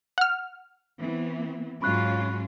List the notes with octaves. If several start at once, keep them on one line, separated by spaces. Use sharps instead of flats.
F#5 F6
E3 B3 C4
G#2 F#3 C#4 F4 B5 C#6 F#6